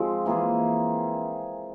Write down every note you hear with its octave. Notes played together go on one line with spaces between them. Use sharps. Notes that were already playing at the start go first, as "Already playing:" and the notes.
Already playing: F3 G#3 C4
E3 A#3 F4 G#4